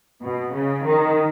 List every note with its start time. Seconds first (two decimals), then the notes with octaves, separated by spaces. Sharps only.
0.22 B2
0.54 C#3
0.86 D#3